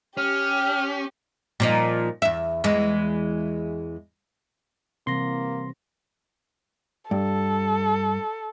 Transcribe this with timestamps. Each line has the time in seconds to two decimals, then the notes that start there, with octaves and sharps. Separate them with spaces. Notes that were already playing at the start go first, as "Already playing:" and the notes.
0.17 C#4 G4 F6
1.60 A#2 F3 D#4
2.22 E2 E5
2.64 E2 E3 G#3
5.07 C3 E3 G3 A#3 C4 C6 A#6
7.11 G2 A4